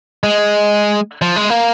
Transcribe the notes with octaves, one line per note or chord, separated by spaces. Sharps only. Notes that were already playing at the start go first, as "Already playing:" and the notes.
G#3
F3
G#3
A#3